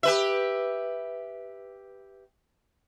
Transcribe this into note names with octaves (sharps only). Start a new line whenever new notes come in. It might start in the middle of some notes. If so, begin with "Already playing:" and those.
G4 B4 E5